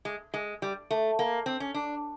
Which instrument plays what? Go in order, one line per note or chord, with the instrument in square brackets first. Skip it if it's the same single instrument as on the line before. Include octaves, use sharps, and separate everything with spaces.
[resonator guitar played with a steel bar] G#3
G#3
G3
A3
A#3
C4
C#4
D4